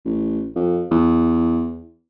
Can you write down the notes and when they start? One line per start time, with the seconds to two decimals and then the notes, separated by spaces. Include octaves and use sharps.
0.05 A1
0.56 F2
0.91 E2